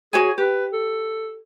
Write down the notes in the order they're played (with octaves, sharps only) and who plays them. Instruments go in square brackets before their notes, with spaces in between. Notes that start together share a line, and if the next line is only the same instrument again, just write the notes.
[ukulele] F#4 C#5 G#5 [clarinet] G#4
[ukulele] G4 [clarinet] B4
[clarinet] A4